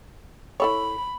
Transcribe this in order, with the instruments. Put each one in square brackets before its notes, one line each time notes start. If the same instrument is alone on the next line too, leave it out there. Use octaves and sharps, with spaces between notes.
[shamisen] E4 A4 C#5 [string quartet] B5